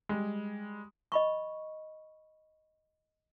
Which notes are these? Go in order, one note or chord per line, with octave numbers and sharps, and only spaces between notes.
G3 G#3
D#5 B5 C#6